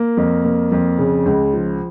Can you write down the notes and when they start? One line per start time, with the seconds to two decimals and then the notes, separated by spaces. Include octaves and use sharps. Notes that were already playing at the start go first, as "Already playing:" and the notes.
Already playing: A#3
0.17 F2
0.45 A#3
0.72 F2
0.98 C#3
1.26 C#2
1.53 F3